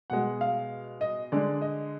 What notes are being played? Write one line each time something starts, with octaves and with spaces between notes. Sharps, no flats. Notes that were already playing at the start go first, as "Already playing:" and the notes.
B2 G#3 F#5
F5
D#5
D3 G#3 D5
D#5